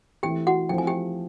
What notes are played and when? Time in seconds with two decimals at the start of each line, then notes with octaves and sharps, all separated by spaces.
0.23 E3 A3 C4 E4 G4 G5
0.47 F#4 F#5
0.69 F3 A3 C4 E4 G5
0.78 G#5
0.87 G4 G5